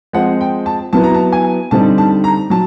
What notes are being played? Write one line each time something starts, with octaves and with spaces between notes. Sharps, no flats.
F3 G#3 C4 F#5
G5
A5
F#3 B3 E4 A5
A#5
A5
G#5
D3 G3 C4 D#4 A5
A5
A#5
F#3 A5